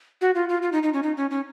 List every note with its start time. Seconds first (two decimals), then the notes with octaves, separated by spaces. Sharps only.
0.21 F#4
0.35 F4
0.49 F4
0.62 F4
0.72 D#4
0.83 D#4
0.93 C#4
1.03 D#4
1.17 C#4
1.31 C#4